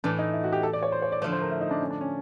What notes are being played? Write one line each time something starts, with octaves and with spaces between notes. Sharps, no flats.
A2 E3 A3 D4
D#4
E4
F#4
G4
A4
D5
C#5
C5
C#5
D5
D3 F3 A3 C#5
C5
A#4
E4
D#4
D4
C#4
D4
C#4